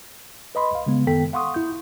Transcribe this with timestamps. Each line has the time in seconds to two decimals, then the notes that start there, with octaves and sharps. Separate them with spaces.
0.55 B4 D#5 B5 C6
0.73 C2 F5
0.86 C#3 G#3 B3
1.07 F#2 D#3 B3 A4 G5 B6
1.33 F5 F#5 C6 C#6 D#6
1.54 E4 G6